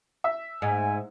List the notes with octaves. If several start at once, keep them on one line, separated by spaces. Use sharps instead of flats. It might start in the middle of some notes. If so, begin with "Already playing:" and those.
E5
G#2 G#5